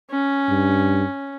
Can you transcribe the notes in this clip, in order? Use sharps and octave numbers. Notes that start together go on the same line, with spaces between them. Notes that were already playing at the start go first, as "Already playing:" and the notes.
C#4
G2